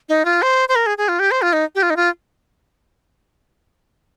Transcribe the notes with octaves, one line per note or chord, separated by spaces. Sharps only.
D#4
F4
C5
C5
A#4
G#4
G#4
F4
G4
C5
F4
D#4
G4
F4
D#4
F4